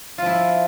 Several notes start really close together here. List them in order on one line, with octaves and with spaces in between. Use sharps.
F4 F3 E4